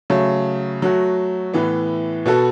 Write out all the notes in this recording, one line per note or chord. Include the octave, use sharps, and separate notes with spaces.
C#3 F#3 A3
F#3 A3 F#4
A2 E3 B3
B2 B3 F#4 A4